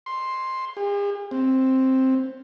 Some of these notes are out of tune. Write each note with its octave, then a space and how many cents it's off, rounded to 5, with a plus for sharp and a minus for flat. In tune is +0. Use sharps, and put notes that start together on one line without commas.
C6 +5
G#4 -45
C4 +5